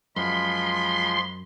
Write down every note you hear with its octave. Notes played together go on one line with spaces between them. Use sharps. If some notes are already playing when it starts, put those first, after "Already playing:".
F#2 F3 G#3 F4 B5 C6